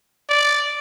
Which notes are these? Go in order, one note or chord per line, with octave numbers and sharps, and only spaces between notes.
D5